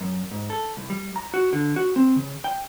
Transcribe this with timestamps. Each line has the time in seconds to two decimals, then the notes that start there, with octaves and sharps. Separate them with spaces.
0.01 F#2
0.31 G#2
0.50 A4
0.77 C2
0.90 G3
1.16 A#5
1.34 F#4
1.53 D3
1.76 F#4
1.96 C4
2.16 C#3
2.44 G5